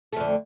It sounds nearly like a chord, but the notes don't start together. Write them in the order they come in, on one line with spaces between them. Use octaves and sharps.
A3 F2 D3